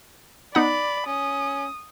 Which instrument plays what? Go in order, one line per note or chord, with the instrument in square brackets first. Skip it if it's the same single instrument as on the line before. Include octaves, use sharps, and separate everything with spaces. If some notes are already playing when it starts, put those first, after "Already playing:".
[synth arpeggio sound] B3 D#4 F#5 [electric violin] D5 [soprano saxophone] B5
[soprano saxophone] C#4 [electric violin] D#6